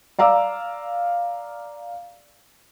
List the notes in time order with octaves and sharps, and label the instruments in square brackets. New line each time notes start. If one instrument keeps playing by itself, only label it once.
[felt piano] D5 F5 A#5 D6 E6